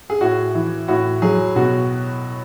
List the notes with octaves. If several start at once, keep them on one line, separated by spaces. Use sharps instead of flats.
G#4
A2 F#4
E3
A2 F#4
F#3 G#4
B2 F#4